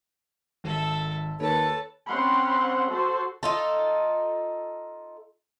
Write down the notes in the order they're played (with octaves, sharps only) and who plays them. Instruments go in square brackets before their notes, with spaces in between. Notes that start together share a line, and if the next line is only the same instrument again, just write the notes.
[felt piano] G#1 [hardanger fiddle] A4 E5
[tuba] D#2 [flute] A4 [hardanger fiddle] B4 A5 [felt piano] C#5
[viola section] C4 C#4 F#5 B5 C6
F#4 A4 C5
[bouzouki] D#4 F4 A4